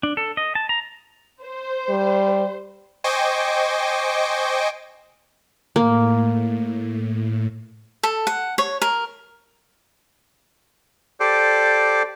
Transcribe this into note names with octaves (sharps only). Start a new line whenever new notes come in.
D4
A4
D#5
A5
A#5
C5
G3
C5 D#5 G5 G#5 C#6 D6
A2 A#3
A4
F#5
C#5
A#4
G4 A4 C5 D5